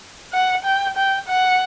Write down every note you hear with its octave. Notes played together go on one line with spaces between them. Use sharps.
F#5
G5
G5
F#5